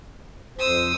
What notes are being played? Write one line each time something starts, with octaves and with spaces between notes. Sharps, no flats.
F2 C5 D#6 E6